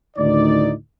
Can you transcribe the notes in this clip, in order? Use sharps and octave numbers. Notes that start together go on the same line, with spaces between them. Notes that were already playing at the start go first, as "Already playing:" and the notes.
D2 A2 D#3 D#4 D5